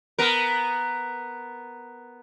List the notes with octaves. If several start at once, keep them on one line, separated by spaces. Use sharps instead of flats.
B3 A#4